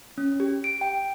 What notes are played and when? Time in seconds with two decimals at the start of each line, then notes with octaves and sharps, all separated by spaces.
0.18 C#4
0.40 G4
0.64 D7
0.81 G5